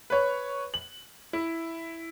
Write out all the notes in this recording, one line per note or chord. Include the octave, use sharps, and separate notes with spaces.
B4 C#5
F#7
E4